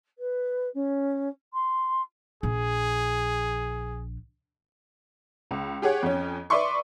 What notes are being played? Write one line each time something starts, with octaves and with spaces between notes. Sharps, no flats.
B4
C#4
C6
A#1 G#4
C#2
G4 G#4 C#5 F#5
F2 C#4
B4 D5 E5 C6 C#6